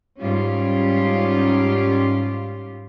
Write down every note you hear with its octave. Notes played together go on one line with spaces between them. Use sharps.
G#2 G3 C#4 F4 G4